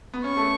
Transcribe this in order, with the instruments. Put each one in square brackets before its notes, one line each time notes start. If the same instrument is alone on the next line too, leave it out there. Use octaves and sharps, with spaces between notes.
[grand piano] B3
[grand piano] C#4 [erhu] C#6
[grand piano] A3